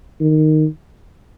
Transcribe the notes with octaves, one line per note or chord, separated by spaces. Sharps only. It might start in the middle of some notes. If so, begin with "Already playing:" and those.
D#3